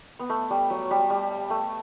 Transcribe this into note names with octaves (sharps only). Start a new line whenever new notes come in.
B3
A3
G3
F#3
G3
G3
A3